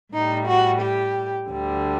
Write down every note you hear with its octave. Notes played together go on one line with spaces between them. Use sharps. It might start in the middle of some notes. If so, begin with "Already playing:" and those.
A2 G3 D#4
F#4
G4
D2 D3 G3